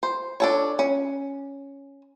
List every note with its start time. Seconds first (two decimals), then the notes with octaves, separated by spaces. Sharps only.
0.03 C5
0.40 D4 A4 C#5
0.79 C#4